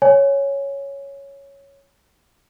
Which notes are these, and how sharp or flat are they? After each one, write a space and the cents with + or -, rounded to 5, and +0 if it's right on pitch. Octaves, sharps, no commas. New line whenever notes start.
C#5 +0 G#5 +5